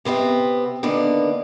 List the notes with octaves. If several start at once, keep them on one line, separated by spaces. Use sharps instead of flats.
C3 B3 C4 E5
D3 D#3 A#3 B3 D4